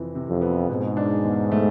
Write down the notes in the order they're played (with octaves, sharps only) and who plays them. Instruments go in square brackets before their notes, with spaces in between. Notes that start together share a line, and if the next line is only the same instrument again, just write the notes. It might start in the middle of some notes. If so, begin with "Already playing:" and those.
Already playing: [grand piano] F2 C3 E3
C3
[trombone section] F2
[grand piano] B3
[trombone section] G#2 [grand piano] B2
[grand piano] D4
E2
A3